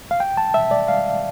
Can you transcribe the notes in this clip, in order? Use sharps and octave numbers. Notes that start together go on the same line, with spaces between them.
F5
G5
A5
E5
D5
F5